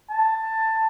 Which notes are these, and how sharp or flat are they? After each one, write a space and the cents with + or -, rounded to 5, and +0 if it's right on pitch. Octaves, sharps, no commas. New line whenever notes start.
A5 +15